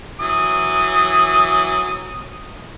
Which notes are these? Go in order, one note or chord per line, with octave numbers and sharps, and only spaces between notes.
E3 F#3 D#6